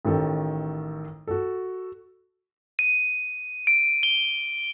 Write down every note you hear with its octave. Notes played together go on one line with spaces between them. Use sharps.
A1 D#3 A4
F#4 A4
D#7
D7
G7